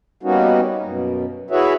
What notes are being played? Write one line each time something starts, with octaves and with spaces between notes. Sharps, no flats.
G3 A#3 B3 C#4 D#4 F#4
F#2 B2
E4 F#4 G#4 B4 C#5 E5